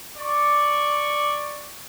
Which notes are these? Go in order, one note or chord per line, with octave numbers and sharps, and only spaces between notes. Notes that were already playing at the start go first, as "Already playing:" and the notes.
D5 C#6